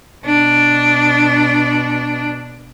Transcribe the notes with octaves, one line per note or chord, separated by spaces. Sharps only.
B2 D4